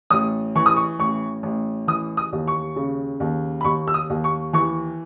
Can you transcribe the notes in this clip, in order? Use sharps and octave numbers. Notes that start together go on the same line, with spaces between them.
A1 D#6
E3 C#6
D#6
C#6
A1 C#6
A1
E3 D#6
D#6
D#2
C#6
C#3
D#2
B5
D#2 C#6
E6
D#6
D#2
C#6
E3 C#6